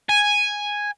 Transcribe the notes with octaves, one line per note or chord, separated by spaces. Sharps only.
G#5